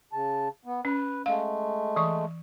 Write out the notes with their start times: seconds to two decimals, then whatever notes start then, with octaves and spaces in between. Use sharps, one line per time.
0.13 C#3 A5
0.65 B3
0.85 C#4 B4
1.26 G#3 A3 F5
1.96 E3 C#6